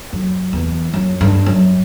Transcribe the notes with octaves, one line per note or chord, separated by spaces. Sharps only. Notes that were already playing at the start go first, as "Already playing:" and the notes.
F#2
E2
F#2
G2
F#2